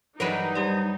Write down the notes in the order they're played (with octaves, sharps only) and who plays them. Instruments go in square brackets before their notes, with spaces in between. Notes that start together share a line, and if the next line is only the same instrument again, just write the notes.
[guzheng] G2 E3 F#3 [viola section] D#4 [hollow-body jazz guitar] A#4 B4
[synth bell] G3 G4 D5